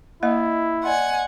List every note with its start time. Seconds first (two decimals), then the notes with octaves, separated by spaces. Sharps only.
0.23 A#3 E4 D#5 G5 D#6
0.83 D5 D#5 F#5 G#5 C6